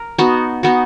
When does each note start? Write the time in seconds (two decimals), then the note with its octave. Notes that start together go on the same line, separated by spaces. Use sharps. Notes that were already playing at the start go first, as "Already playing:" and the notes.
Already playing: A#4
0.18 B3 D#4 F#4
0.63 B3 D#4 F#4